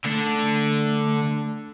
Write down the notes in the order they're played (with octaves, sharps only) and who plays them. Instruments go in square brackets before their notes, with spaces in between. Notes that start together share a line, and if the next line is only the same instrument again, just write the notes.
[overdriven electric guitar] D3 D4 [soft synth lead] A3